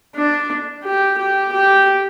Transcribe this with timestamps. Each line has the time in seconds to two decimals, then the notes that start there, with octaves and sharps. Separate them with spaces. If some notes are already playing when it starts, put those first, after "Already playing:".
0.16 D4
0.84 G4
1.18 G4
1.52 G4